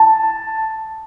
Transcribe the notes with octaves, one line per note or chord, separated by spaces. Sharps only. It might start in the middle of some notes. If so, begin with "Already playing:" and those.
Already playing: A5